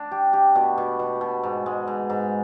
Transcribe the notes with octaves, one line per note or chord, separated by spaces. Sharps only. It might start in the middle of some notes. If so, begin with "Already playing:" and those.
Already playing: D4
G4
G4
B2
B2
B2
B2
G#2
G#3
G#2
G#2